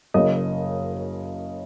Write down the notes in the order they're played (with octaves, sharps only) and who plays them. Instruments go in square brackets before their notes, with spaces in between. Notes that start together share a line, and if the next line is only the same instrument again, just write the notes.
[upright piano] F#1 F#2 C#3 D#5